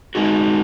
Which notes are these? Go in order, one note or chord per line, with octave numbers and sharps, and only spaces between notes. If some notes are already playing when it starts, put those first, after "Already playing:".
G#3 D#4 F#4